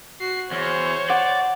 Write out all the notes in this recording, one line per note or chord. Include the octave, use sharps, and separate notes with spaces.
F#4 C7
E2 C5 C#5
D5 F#5